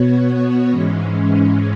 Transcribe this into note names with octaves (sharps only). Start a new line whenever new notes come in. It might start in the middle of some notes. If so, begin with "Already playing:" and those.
Already playing: B2 B3 F#4 C#5
G#2 E3 G#3 C#4